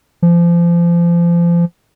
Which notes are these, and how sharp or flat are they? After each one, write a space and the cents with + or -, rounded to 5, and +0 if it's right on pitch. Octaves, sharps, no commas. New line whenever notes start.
F3 -30